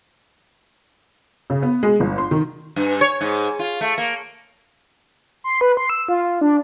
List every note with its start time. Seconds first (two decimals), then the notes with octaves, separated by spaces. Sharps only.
1.50 C#3
1.62 B3
1.83 G#3
2.00 G1
2.18 C6
2.31 D#3
2.76 G2
3.01 C#5
3.21 G#2
3.59 F4
3.81 A3
3.98 A#3
5.44 C6
5.61 B4
5.77 C6
5.90 E6
6.09 F4
6.41 D4